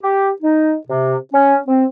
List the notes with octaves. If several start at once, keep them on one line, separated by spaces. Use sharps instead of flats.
G4
D#4
C3
C#4
C4